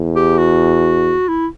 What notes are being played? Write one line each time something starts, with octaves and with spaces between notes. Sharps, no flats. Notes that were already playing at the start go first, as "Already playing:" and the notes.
Already playing: E2
G4
F#4
E4